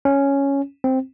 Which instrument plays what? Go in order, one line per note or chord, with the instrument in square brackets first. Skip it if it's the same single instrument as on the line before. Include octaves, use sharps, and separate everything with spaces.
[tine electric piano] C#4
C4